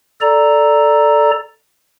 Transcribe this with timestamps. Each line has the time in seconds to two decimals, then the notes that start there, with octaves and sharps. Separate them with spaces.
0.21 A4 D5 A#5